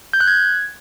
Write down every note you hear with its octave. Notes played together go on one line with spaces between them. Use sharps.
G6
F#6
G#6